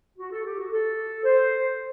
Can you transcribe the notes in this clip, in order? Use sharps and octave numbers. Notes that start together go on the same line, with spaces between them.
F#4
A4
G4
F#4
A4
C5